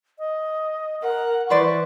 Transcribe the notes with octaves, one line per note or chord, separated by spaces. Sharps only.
D#5
A#4 F#5
E3 B4 C5 D5 C#6